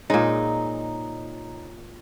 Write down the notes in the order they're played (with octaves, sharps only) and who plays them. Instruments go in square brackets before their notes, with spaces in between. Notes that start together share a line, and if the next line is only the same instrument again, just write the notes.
[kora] A#2 G#3 [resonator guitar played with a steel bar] D#4 [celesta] C#5 A#5